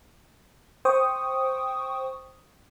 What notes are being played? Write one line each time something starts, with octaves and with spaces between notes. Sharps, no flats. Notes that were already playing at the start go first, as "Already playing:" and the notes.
C5 G5 C#6 D#6